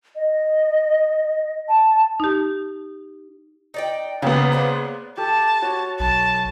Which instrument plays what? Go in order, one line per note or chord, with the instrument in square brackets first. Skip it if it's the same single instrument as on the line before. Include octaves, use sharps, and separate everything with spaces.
[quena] D#5
A5
[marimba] D#4 G4
[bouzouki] D#4 D5 G5
[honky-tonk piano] C#3 A#3 B3 [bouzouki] F#3 G4
[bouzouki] D4 G#4 C5
[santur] G4 A4 [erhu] A5
[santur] F#4 C#5
[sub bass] B1 [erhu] A5